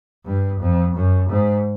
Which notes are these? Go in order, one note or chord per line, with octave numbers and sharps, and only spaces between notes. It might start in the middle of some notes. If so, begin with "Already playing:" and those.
G2
F2
F#2
G#2